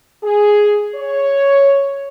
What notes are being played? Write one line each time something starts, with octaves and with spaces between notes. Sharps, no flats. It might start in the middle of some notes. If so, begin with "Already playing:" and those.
G#4
C#5